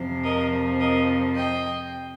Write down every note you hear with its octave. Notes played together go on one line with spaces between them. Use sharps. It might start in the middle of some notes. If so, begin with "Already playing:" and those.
Already playing: F2 C3 F3 C4
A#4 D#5
A#4 D#5
D#5 G5